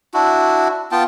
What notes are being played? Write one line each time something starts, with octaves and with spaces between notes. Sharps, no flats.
D4 E4 F#4
B3 F4 G5 A5